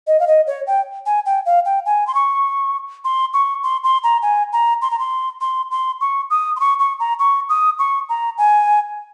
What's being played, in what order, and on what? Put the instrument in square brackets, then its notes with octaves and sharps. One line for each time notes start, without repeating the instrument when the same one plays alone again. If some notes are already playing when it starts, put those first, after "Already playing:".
[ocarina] D#5
F5
D#5
C#5
G5
G#5
G5
F5
G5
G#5
C6
C#6
C6
C#6
C6
C6
A#5
G#5
A#5
C6
A#5
C6
C6
C6
C#6
D#6
C6
C#6
C#6
A#5
C#6
D#6
C#6
A#5
G#5